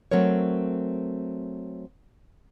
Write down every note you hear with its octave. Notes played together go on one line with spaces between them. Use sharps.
F#3 A3 C4 A#4 C#5